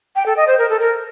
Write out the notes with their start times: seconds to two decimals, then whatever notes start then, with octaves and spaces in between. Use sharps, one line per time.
0.16 G5
0.26 A4
0.37 D#5
0.47 C5
0.59 A#4
0.69 A4
0.80 A#4